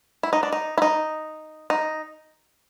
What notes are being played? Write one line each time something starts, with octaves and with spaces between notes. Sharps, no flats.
E4
D#4
D4
D#4
E4
D#4
D#4